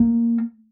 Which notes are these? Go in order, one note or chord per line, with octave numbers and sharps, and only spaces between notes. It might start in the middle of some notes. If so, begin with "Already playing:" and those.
Already playing: A#3